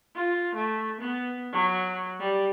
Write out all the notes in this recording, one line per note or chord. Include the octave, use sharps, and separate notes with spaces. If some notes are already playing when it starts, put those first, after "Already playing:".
F4
A3
B3
F#3
G3